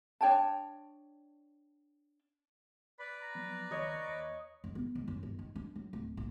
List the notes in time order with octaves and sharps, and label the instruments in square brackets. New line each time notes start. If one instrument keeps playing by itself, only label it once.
[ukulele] D4 C#5 G5 A5
[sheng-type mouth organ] B4 D5 [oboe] B5
[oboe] A#5
[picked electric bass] F3 F#3 B3
[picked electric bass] C#2 D#3 [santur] C#5 D#5
[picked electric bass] D#2
[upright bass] F2
B3
G#2
F#2
G1
D#3
D4
F#3
D1
A#1